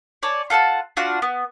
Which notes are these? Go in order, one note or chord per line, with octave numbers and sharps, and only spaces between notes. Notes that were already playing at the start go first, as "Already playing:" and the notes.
C#5 D5 G#5 A5
F4 A4 F#5 A5
D4 F4 F#4 F#5
B3